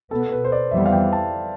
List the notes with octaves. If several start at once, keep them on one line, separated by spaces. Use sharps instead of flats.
B2 B3 A4
B4
C5
D5
F2 E3 G3 B3 E5
F5
G5
A5